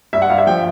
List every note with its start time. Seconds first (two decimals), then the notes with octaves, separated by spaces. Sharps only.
0.13 G2 E5
0.22 F#5
0.30 G2 F5
0.38 E5
0.47 F3 G5